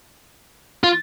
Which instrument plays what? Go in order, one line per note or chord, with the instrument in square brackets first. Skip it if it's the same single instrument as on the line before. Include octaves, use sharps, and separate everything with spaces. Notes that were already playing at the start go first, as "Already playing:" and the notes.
[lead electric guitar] F4